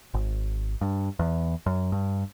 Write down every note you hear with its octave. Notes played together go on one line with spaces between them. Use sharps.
G#1
G2
E2
F#2
G2